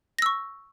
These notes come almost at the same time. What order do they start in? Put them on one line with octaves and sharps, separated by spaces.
A#6 E6 C#6